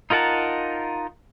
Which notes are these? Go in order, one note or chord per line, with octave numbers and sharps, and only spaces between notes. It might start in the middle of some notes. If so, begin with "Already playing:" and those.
D#4 F4 A#4 F#5 A5